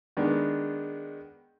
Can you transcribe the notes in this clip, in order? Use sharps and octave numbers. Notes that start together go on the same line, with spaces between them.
D#3 G#3 B3 D4